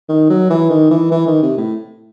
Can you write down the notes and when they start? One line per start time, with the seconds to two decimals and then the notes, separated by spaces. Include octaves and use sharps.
0.09 D#3
0.30 F#3
0.50 E3
0.70 D#3
0.90 E3
1.11 E3
1.27 D#3
1.43 C3
1.57 A2